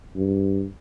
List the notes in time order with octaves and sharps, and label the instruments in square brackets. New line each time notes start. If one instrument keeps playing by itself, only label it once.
[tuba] G2